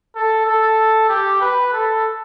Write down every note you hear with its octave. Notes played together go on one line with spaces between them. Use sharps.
A4
A4
G4
B4
A4